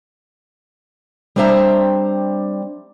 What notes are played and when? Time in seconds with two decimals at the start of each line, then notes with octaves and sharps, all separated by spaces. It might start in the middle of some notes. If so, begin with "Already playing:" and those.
1.36 G3 C4 D4 C5 E5 A#5